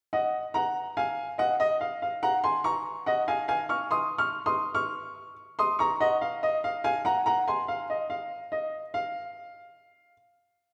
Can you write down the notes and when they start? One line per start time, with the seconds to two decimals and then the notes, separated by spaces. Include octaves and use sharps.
0.13 D#5 F#5
0.54 F#5 A#5
0.97 F5 G#5
1.38 D#5 F#5
1.60 D#5
1.81 F5
2.02 F5
2.23 F#5 A#5
2.44 G#5 C6
2.64 A#5 C#6
3.06 D#5 F#5
3.28 F5 G#5
3.48 F5 G#5
3.69 C#6 F6
3.91 C6 D#6
4.18 C#6 F6
4.46 C6 D#6
4.75 C#6 F6
5.59 C6 D#6
5.79 A#5 C#6
6.00 D#5 F#5
6.21 F5
6.43 D#5
6.64 F5
6.84 F5 G#5
7.05 F#5 A#5
7.26 F#5 A#5
7.48 G#5 C6
7.68 F5
7.90 D#5
8.10 F5
8.52 D#5
8.94 F5